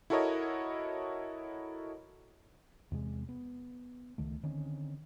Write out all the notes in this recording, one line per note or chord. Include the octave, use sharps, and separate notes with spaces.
E4 F#4 A4 A#4 C#5 D#5
E2 C3 G#3
B3
C#2 D#3 A3
D3 D#3 C4 C#4